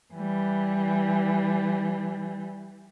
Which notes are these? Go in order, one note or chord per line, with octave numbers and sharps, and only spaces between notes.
E3 G3